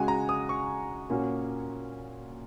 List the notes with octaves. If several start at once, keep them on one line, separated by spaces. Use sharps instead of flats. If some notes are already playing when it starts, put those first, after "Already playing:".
Already playing: C#3 G#3 F#4 G#5
A#5
D#6
C#6
A#2 A#3 C#4 F#4